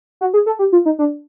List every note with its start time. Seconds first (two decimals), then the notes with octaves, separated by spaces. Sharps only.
0.21 F#4
0.34 G#4
0.46 A4
0.59 G4
0.73 F4
0.86 D#4
0.99 D4